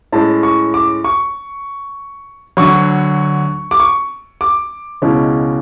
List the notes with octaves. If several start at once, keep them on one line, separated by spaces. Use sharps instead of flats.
A2 G#3 C#4 A5
C#6
D6
C#6
D2 D3 F#3 C#6
D6
C#6
D6
C#2 B2 G#3 C#4 E4